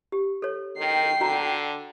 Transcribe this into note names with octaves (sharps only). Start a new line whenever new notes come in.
G4
A4 C#5
D#3 G5 C7
D3 F#4 A#5